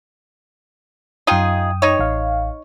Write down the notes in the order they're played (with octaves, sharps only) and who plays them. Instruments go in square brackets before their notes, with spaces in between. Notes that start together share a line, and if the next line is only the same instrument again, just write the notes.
[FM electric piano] F#2 G5 D#6 [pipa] D#4 F4 G#4
[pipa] D#4 C#5
[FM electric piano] A1 F5